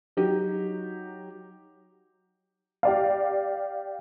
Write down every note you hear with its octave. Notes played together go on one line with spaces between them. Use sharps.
F#3 D#4 G4
G4 D5 F5